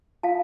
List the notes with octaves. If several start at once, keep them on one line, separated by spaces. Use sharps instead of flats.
F4 F5 A5